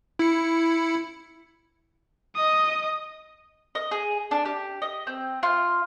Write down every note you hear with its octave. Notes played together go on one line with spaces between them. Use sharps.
E4 C#7
D#5 D#6
D#5
G#4
D4
G4
D#5
C4
F4